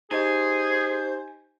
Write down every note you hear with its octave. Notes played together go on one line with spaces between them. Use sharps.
D#4 G4 G#4 C5 D#5 G#5